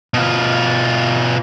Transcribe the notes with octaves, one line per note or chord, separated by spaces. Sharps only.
B2 F4